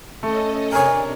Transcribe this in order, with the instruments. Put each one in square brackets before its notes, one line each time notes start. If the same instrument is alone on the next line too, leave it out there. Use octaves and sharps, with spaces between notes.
[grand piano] A3 [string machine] C#4 A4 D#5
[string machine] C3 D4 [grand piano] A#4 C#5 [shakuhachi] G#5